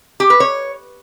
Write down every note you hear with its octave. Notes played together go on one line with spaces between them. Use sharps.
G4
B4
C#5